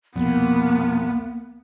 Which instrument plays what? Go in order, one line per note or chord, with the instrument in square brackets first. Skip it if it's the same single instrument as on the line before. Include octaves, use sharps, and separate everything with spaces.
[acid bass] C2 [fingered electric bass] F2 B2 [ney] A#3 [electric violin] B3